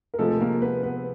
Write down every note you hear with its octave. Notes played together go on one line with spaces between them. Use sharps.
A#4
C3 F3 G#3 A3 A4
A4
A#3 A#4
B3 B4
B3 B4